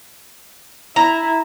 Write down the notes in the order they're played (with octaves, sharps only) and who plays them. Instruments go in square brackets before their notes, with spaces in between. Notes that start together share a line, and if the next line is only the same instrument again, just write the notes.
[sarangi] E4 [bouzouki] A#5